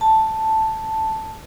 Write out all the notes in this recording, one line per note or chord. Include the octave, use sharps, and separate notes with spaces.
A5